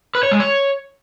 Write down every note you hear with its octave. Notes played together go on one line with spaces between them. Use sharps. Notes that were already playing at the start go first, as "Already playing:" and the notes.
B4
C#5
G#3
C#5